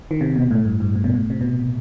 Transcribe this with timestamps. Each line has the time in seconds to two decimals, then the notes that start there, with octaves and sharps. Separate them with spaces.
0.11 D#3
0.21 C3
0.36 B2
0.51 A2
0.65 G2
0.80 G2
0.95 A2
1.04 B2
1.15 A2
1.30 C3
1.41 B2